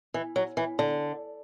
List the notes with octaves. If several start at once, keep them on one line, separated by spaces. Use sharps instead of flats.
E3
F#3
E3
D3